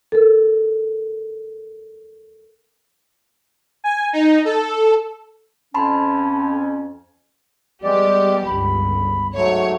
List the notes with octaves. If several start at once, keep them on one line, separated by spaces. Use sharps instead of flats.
A4 A#4
G#5
D#4
A4
F2 C#4 A5 B5 C6
G3 G#3 B3 G4 D5
G1 C#2 B5
G#2 F#3 A3 C#5